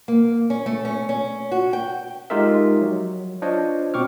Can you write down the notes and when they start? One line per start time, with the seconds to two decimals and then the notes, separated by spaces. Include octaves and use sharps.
0.08 A#3
0.50 C#4
0.66 A3
0.85 C#4
1.09 C#4
1.51 F#4
1.73 G5
2.30 G#3 D#4 F4 G4 A#4 E5
2.81 F#3
3.42 D4 F4 C5 C#5 D#5
3.94 B2 C4 C#6 D6 F6